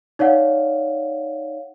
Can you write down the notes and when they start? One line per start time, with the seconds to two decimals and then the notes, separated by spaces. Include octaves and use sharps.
0.19 D#4 C#5 D5 F5 F#5